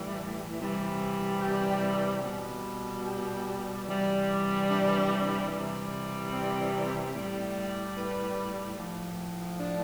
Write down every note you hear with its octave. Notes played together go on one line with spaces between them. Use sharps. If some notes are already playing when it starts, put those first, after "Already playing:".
Already playing: A2 E3 G3
C3 E3 G3
G4
B2 G3
G4
C3 E3 G3
D4
C3 E3 G3
C4
A2 G3
B4
A2 F3
D4